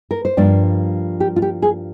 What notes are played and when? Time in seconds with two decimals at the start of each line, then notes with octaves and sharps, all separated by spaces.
0.11 A#4
0.25 C5
0.37 G2 F3 A#3 D4 D5
1.20 G4
1.36 F4
1.42 G4
1.62 G#4